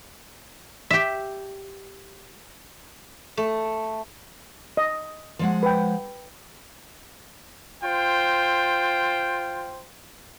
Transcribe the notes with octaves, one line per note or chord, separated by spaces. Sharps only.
G4 E5
A3
D#5
F3 G#3 F#5
B4 G5
F4 C5 G5